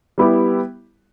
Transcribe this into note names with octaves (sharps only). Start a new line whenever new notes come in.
G3 B3 E4 G4